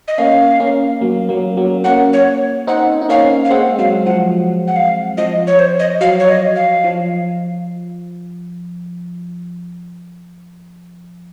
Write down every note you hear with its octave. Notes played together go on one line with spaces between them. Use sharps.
D#5
A#3 C#4 F5
A#3 C#4
F#3 A#3
F#3 A#3
F#3 A#3
A#3 C#4 F#5
C#5
C4 D#4 F#5
D#4
A#3 C#4 F5
F5
G#3 C4 F#5
F#3 F5
F3 F#5
F#5
F5
F3 D#5
C#5
C5
D#5
F#3 F5
C#5
D#5
F5
F3